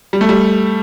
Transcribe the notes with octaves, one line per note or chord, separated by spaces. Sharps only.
G3
A3
G3